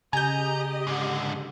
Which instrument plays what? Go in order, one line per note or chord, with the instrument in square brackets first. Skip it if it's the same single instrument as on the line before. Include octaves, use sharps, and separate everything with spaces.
[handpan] C#3 [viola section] G4 D#5 [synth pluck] G#5 G6 [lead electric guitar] A#5
[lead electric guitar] G#2 D3